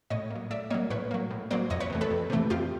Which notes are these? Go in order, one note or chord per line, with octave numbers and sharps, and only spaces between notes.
A2 C#5 D#5
F#3 A#3
A2 D5 E5
F#3 A#3 C#5 D#5
A2 B4 C#5
F#3 A#3
A2
F#3 A#3 C5 D5
F2 C#5 D#5
B4 C#5
C3 E3 A3
A4 B4
F2
C3 E3 A3
F2 F4 G4